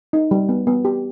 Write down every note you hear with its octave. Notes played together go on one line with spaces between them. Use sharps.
D#4
G3
B3
B3
G4